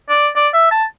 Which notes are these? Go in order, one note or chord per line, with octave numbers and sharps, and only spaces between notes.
D5
D5
E5
A5